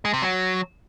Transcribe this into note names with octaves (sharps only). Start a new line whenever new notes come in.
G#3
C3
F#3